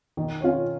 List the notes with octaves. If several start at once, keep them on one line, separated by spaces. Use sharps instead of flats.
D#3
C#4 F4 C#5